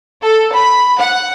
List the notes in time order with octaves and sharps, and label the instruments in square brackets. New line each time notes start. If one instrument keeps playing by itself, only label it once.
[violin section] A4
B5
F#5